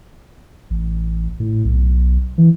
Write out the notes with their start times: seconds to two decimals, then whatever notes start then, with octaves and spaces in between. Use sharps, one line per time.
0.70 A1
1.40 A2
1.65 B1
2.38 E3